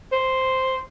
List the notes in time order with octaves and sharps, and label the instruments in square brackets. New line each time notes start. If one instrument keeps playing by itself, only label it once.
[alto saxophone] C5